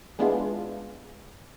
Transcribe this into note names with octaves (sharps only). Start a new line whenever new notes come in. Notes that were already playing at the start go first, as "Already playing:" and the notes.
G#3 B3 D4 E4 F4 G#4